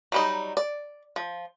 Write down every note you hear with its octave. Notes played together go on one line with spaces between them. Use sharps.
F#3 G3 D#4
D5
F3